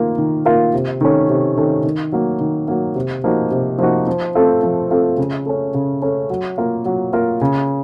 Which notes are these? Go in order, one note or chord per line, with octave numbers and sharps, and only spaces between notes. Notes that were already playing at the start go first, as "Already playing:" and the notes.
Already playing: D#3 A#3 F4 A#4
D#3
A#3 F4 A#4
C3
D#3 A3 C#4
C3
D#3 A3 C#4
D#3
F#3 A#3
D#3
F#3 A#3
C3
F3 A#3 D#4 F#4
C3
F3 A#3 D#4 F#4
F3
A3 C4 F4 A4
F3
A3 C4 F4 A4
C#3
A3 C#4
C#3
A3 C#4
F#3
A#3 F4 A#4
F#3
A#3 F4 A#4
C#3